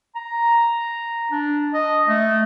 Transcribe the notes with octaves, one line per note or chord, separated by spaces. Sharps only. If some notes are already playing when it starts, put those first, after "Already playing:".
A#5
D4
D#5
A3